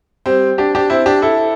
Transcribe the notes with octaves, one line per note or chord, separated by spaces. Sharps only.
G3 C4
D4 G4
D4 G4
C4 E4
D4 G4
E4 A4